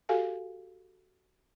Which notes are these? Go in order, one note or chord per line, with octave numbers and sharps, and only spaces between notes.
F#4 G4 A4 F5 G#5